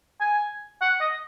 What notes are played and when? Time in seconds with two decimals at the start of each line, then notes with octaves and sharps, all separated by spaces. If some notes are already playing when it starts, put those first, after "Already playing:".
0.20 G#5
0.81 F#5
1.00 D#5